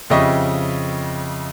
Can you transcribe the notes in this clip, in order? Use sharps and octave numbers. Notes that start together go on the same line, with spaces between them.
F2 C#3 G4 D#5 E5 C#6